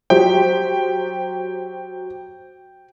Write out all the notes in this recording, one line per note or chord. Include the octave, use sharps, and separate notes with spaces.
F#3 G4 C5 G5